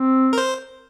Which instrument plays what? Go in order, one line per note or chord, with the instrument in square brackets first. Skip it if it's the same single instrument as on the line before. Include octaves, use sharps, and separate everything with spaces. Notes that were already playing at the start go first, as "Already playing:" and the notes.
Already playing: [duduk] C4
[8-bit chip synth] A#4
C5